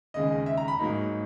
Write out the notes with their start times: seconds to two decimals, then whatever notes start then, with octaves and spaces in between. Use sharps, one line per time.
0.14 D#2 C#3 G#3 D#5
0.46 E5
0.57 A#5
0.68 B5
0.79 G#2 F#3 A#3 D#4